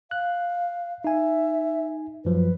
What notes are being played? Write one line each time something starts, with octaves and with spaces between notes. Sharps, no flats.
F5 F#6
D#4 E5 G#5
F#2 F3 F#3 B4